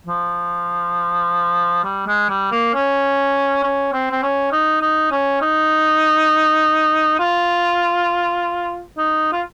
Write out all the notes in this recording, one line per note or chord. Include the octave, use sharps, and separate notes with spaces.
F3
G3
G#3
G3
A#3
C#4
C#4
C4
C4
C#4
D#4
D#4
C#4
D#4
F4
D#4
F4